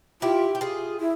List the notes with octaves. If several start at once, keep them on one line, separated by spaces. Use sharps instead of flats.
E4 F4 G4
G4
F4 G#4
E4